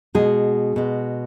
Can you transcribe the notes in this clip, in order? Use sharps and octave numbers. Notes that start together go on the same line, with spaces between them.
B2 G#3 G#4
B2 G#3